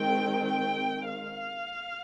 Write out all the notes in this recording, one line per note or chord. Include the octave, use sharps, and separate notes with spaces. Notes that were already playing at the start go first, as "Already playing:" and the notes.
Already playing: D#3 G#3 C4 G5
G5
F5